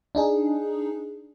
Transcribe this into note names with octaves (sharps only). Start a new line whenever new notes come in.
D4 D#4 G#4